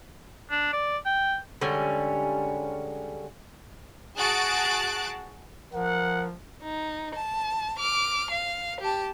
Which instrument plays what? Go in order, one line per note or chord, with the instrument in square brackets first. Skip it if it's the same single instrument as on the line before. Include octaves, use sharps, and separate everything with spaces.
[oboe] D4
D5
G5
[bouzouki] D3 G3 G#3 C#4
[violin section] F#4 G#4 A5 F#6 A6 D7
[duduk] F3 [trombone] A#4 [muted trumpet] F#5
[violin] D#4
A5
D6 F6
F5
G4 A5